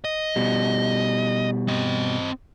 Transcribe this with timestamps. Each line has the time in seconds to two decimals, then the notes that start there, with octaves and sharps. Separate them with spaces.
0.04 D#5
0.36 B2 G3
1.68 C4 D#5